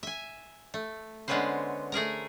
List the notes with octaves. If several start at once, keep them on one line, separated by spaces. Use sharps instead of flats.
E5 G#5
A3
D3 G#3 B3 C#4 B4 C5
A3 G#4 A#4 A#5